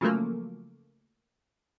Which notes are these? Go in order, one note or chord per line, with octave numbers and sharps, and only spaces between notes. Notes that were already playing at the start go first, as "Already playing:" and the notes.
C#3 F3 F#3 A3 A#3